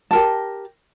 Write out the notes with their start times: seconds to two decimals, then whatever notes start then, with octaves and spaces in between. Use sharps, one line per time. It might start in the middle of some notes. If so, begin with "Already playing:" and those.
0.11 G4 A#4 A5